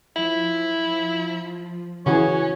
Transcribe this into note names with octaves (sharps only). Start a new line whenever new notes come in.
F3 E4
C#3 E3 C#4 F#4 G#4 C#5